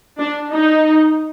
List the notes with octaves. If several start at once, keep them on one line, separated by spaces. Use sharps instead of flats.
D4
D#4